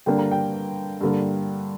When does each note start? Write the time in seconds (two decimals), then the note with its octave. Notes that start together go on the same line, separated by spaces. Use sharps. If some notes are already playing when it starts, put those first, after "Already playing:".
0.06 G2 D3 A#3 D4 G5
0.18 A#5
0.31 G5
1.01 G2 D3 A#3